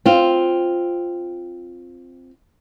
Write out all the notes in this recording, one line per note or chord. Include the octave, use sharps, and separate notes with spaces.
C4 F4